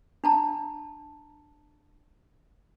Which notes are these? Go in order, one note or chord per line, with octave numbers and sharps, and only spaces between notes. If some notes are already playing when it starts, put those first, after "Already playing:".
D4 A5 A#5